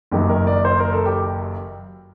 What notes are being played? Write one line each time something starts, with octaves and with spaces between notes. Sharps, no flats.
F#1 F#2 D#3 G4
A#4
D5
C5
A#4
A4
G4